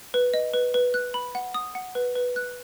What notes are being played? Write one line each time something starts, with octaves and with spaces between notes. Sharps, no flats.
B4
D#5
B4
B4
F#6
B5
F#5
D#6
F#5
B4
B4
F#6